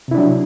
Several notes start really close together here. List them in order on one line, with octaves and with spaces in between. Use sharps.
C3 E4 D4 F#3